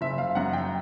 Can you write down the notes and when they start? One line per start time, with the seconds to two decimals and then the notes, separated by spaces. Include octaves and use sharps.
0.01 F#1 E5
0.18 F5
0.35 F#2 F#5
0.53 G5